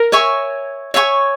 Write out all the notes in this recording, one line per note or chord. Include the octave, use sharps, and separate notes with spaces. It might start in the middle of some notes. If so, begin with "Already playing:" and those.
Already playing: A#4
C#5 E5 G#5 C#6
C#5 E5 G#5 C#6